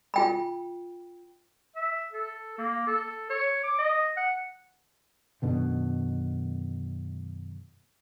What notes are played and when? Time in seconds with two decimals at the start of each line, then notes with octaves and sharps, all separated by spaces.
0.14 F4 G5 B5
1.76 E5
2.12 A4
2.58 A#3
2.87 A4
3.30 C#5
3.64 D6
3.78 D#5
4.17 F#5
5.42 F#2 B2 D3 D#3